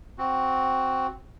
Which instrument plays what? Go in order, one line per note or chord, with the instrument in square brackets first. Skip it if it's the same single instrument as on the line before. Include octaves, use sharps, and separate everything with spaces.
[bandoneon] C4 F#4